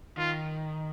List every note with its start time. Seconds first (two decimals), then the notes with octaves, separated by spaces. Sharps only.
0.17 D#3 F4